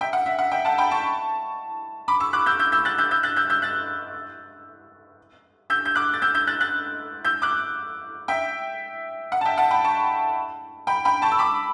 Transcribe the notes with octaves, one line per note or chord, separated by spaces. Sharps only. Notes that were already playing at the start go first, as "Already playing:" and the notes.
E5 G5
F#5
E5
F#5
E5 G5
F#5 A5
G5 B5
A5 C#6
B5 D6
C#6 E6
D6 F#6
E6 G6
E6 G6
E6 G6
F#6 A6
E6 G6
E6 G6
F#6 A6
E6 G6
E6 G6
F#6 A6
E6 G6
G6
D6 F#6
A6
E6 G6
E6 G6
F#6 A6
F#6 A6
E6 G6
D6 F#6
E5 G5
F#5
A5
E5 G5
F#5 A5
G5 B5
A5 C#6
G5 B5
G5 B5
A5 C#6
E6
B5 D6